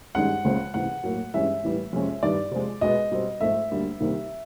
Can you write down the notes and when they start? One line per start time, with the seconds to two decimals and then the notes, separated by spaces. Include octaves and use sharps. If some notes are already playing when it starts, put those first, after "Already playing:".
0.15 G2 D#3 G#3 C#4 F#5
0.44 C#2 C#3 F3 G#3 C4
0.74 C#2 C3 E3 F#5
1.03 A2 F#3 A#3
1.34 G2 E3 G#3 C#4 E5
1.63 A2 E3 G3 B3
1.93 F2 C3 F3 G#3 C#4
2.23 G2 D#3 G3 B3 D5
2.52 C3 F3 G#3
2.81 B2 G#3 B3 D#5
3.11 B2 G3 C4
3.41 G#2 F3 A3 E5
3.70 D2 D3 G3 A#3
4.00 C2 C3 D#3 G3 A#3